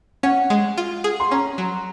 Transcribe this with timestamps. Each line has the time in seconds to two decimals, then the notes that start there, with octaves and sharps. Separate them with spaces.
0.23 C#4 F#5
0.50 G#3
0.77 F4
1.04 G#4
1.20 C6
1.31 C#4 A#5
1.58 F#3